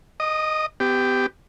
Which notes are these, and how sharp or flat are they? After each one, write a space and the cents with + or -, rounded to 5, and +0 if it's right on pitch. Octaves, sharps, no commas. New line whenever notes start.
D#5 -5 D#6 -40
B3 +40 G4 +0